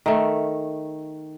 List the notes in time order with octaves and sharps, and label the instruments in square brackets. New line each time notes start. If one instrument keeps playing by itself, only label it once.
[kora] D#3 A3